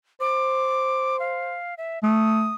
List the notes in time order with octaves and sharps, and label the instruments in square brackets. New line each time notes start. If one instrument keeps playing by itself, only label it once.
[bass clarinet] C5 [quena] D6
[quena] F5
E5
[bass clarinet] A3 [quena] D#6